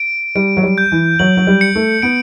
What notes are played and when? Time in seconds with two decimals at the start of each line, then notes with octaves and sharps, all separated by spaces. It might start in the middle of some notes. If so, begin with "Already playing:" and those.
Already playing: D7
0.35 G3 D7
0.57 F#3
0.63 G3
0.78 G6
0.92 E3
1.19 F#3 F#7
1.37 F#3
1.47 G3
1.61 C#7
1.75 A3
2.02 B3 D7